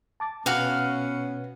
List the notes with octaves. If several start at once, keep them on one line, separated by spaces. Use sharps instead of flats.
A5 D6 A6
B2 B3 C#4 F#4 B4 F5